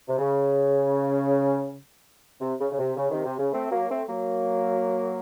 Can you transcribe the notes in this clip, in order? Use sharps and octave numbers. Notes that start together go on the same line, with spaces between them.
C3
C#3
C3
C#3
C#3
C3
C#3
C3 D#3
C3
C#3
A3 C4
F#3 A#3
A3 C4
F#3 A#3